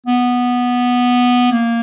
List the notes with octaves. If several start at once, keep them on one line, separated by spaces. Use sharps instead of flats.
B3
A#3